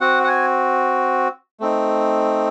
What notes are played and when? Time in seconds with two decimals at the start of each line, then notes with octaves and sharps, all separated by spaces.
0.01 C4 F#4 F#5
0.24 F#5
0.27 G#5
1.60 A3 C4 D#4